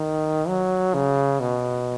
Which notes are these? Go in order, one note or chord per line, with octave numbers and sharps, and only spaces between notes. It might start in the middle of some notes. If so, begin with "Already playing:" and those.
Already playing: D#3
F#3
C#3
B2